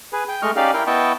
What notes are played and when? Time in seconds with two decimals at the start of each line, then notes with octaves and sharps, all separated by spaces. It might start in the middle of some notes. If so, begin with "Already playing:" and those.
0.13 G#4 B4
0.29 G5
0.42 G#3 A3 D#5 C#6 F6
0.56 C#4 D#4 G4 D5 F5
0.74 E4 A#4 G5 F6
0.87 B3 E4 D#5 G5 A5 C#6